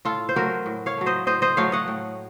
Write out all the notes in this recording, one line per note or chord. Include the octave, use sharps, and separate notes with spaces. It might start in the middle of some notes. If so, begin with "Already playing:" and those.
A2 F4 A4
C5
F#3 A3 F#4 A#4
A2
C#5 F5
F#3 A3
C5 D#5
A2 C5 D#5
C5 D#5
F#3 A3 C#5 F5
D#5 F#5
A2